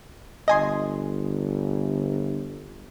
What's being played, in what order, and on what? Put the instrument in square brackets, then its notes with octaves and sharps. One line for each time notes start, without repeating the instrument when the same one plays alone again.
[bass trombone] G1 [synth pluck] D#5 G#5 C6